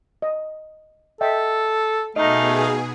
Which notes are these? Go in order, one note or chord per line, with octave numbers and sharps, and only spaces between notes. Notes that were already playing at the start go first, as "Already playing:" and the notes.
D#5
A4 D#5 E5 G5
B2 A3 D#4 G#4 D#5 F5 A#5